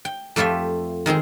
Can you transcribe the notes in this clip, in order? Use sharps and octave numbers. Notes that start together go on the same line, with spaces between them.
G5
F2 A3 F4 G4 E5
D#3 G#3 C4 G#4